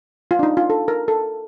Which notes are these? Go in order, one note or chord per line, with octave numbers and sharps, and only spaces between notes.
F4
D4
D#4
F4
A4
A#4
A4